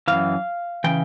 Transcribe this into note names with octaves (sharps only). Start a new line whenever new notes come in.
F#2 C#3 E3 F5
C#3 E3 G5